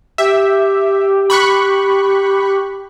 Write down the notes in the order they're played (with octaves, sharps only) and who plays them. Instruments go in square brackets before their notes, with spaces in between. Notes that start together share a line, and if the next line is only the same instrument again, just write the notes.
[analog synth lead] G4 [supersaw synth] E5
[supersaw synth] B5 C#6 F#6